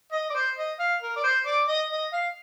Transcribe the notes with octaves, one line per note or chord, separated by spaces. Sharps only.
D#5
D5
C5
D#5
F5
A#4
D5
C5
D5
D#5
D#5
F5